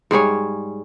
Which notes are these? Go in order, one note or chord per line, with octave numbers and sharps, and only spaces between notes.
G#2 G3 G#4 C#5